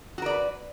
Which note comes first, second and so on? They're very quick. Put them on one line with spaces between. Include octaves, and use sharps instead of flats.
F#4 A#4 D5 B4